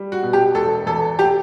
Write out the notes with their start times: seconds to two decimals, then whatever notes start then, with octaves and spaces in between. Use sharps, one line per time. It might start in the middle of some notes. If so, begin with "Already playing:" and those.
Already playing: G3
0.12 F#4
0.23 B2
0.33 G4
0.55 E1 A4
0.86 E2 A4
1.19 G4